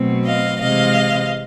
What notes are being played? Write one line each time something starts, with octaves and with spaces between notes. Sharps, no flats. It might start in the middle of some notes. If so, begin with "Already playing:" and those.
Already playing: B2 F#3 A3 C4
D#5 F5
C3 E3 G#3 C4 D#5 F5